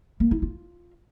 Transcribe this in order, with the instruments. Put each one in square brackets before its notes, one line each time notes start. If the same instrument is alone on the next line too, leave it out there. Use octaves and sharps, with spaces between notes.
[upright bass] A#3
E4
F4